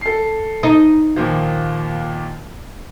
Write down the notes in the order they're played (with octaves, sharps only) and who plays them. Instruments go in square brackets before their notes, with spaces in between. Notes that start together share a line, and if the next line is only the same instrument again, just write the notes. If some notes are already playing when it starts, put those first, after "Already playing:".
[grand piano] A4 C7
[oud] D#4
[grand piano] D#2 A#2 F3